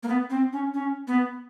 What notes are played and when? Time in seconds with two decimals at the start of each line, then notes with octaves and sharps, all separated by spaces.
0.03 A#3
0.08 B3
0.30 C4
0.53 C#4
0.74 C#4
1.08 B3